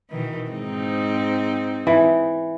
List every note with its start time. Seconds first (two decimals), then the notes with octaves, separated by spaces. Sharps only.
0.10 B2 D#3 E3
0.50 G#2 C4 D#4
1.87 E3